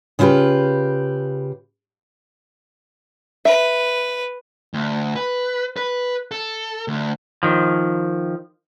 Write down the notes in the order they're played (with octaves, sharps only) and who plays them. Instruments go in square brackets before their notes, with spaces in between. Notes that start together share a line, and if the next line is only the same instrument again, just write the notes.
[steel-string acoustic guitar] C#3 E4 F4 G4 B4
[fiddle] B4 [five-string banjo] E5
[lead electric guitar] D2
B4
B4
A4
D2
[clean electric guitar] D#3 F3